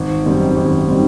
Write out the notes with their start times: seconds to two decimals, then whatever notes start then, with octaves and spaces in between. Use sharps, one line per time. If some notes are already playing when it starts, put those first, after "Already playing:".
Already playing: G#1
0.26 F#2 D#3 G3 C4
0.57 G#1
0.88 D#3 G3 C4